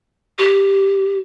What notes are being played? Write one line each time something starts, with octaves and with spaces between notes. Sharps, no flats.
G4